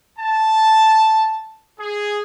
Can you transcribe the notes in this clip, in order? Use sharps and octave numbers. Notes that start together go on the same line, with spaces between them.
A5
G#4